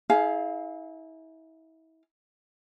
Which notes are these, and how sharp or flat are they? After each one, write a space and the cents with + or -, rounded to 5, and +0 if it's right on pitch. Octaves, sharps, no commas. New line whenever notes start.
E4 -35 G#4 +20 F5 +0